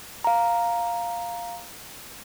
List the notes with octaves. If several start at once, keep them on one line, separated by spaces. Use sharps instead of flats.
F5 A#5